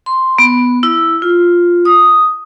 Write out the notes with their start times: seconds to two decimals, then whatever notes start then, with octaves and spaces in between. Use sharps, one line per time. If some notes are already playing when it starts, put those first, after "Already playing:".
0.06 C6
0.38 B3
0.83 E4
1.22 F4
1.85 D#6